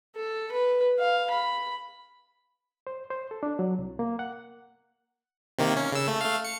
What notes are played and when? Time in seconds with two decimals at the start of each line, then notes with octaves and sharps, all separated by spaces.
0.16 A4
0.52 B4
0.99 F5
1.31 B5
2.87 C5
3.10 C5
3.31 A4
3.43 D4
3.59 F#3
3.79 C2
3.99 A#3
4.19 F#5
5.59 C3 D#3 A#3
5.77 C#4
5.92 C#3 E6
6.07 A3
6.21 A3 F5
6.44 C#7